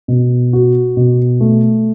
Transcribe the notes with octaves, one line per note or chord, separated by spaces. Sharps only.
B2
F#4
B2
A3